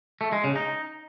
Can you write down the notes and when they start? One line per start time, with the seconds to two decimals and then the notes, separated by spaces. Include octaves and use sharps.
0.21 A3
0.32 G#3
0.44 C#3
0.56 D#4